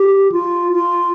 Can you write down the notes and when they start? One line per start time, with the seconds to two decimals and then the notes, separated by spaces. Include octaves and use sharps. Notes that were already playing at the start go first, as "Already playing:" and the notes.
Already playing: G4
0.32 F4
0.73 F4